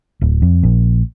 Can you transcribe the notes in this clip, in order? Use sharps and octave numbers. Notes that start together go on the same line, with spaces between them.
D1
F2
A#1